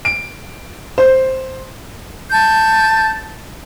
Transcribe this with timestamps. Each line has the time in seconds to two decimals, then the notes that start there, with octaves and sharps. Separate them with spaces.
0.05 D7
0.98 C5
2.31 A5 G6